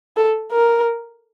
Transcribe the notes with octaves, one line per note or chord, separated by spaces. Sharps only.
A4
A#4